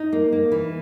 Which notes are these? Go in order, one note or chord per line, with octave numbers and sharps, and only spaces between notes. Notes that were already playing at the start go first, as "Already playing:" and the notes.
Already playing: D#4
A#3
A#3
E3